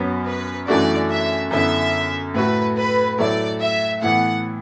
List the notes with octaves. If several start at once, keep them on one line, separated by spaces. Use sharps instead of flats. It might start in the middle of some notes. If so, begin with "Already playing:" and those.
Already playing: F#2 F#3 B3
B4
F#2 E3 A3 D4 F#4 D5
E5
F#2 D3 B3 E4 E5
A2 A3 F#4 B4
B4
A2 F#3 A3 E4 D5
E5
A2 E3 B3 F#5